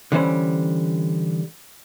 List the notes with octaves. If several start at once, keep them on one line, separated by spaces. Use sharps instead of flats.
D3 E3 G3 C#4 C5 B5